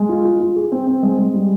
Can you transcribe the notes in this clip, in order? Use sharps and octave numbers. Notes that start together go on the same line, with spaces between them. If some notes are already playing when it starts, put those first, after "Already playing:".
Already playing: G#3
F4
F4
F4
G#4
C4
C4
G#3
G#3
G3